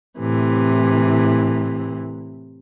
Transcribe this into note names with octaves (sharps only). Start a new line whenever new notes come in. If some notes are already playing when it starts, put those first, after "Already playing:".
A2 C3 E3